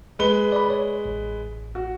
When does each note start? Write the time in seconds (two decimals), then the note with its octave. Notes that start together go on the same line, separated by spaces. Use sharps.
0.19 G#3 B4 G7
0.52 D5 B5
0.70 C#5
1.05 A1
1.75 F#4